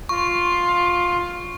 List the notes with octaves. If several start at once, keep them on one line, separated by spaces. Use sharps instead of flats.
F4 C#6